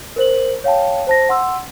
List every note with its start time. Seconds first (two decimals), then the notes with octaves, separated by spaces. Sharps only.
0.16 A#4 C5 F#7
0.64 C#5 F5 G5 A5
1.07 C5 A5 A#6
1.29 F#5 C6 E6